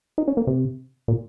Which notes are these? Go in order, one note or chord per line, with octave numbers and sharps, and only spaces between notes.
D#4
C#4
A#3
C3
A#2